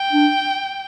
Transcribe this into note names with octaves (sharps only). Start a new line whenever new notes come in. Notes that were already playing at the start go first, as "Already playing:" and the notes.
Already playing: G5
D4